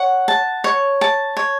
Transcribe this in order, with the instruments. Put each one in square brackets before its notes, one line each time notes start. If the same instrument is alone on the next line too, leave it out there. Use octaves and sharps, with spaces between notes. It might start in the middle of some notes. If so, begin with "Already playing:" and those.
Already playing: [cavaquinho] C#5 F#5
A5
C#5
A5
C#5